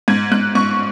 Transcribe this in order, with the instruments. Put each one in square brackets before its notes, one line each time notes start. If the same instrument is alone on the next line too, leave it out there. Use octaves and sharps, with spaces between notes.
[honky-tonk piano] G#2 G#6
G#2 F#6
G#2 C#6